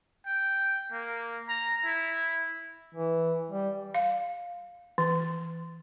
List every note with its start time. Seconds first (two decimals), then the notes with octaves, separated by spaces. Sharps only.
0.26 G5
0.92 A#3
1.49 A#5
1.85 E4
2.95 E3
3.51 G3
3.94 F5
4.98 E3